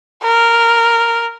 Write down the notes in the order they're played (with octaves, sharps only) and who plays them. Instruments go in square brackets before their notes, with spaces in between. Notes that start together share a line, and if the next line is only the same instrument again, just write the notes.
[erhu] A#4